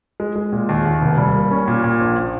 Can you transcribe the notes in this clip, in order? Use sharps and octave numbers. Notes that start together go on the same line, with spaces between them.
G#3
G#3
A#2
D#2
D#2
F1
G3
A#3
C#4
A#2
A#2
A#1